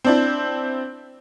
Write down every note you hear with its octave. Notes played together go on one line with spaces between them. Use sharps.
C4 D4 E4